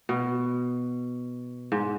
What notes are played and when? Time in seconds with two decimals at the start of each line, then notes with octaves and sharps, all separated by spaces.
0.09 B2
1.72 G#2